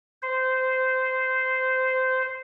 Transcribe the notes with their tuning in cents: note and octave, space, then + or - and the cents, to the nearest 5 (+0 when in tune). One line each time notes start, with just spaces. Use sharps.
C5 -15